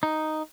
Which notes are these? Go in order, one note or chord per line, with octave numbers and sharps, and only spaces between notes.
D#4